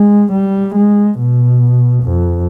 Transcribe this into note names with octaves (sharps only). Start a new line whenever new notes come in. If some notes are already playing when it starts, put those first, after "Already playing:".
Already playing: G#3
G3
G#3
B2
F2